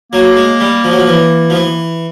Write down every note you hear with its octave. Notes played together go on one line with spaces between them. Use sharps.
F#3 A#3
G#3
G3
F3
F#3
F3
E3
F3
E3